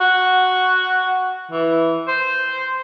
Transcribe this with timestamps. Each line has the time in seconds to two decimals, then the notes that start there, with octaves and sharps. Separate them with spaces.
0.01 F#4
1.52 E3
2.08 C5